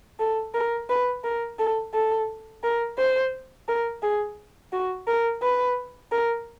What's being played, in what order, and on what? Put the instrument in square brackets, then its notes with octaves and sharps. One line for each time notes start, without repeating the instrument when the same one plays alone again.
[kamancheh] A4
A#4
B4
A#4
A4
A4
A#4
C5
A#4
G#4
F#4
A#4
B4
A#4